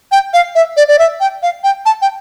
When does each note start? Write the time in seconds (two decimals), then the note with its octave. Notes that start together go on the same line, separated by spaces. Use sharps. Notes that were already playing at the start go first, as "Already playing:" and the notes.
0.12 G5
0.34 F5
0.55 E5
0.77 D5
0.88 D5
0.99 E5
1.20 G5
1.43 F5
1.64 G5
1.86 A5
2.02 G5